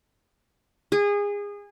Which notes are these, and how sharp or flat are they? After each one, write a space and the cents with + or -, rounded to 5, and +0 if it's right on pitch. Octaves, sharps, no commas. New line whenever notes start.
G#4 -25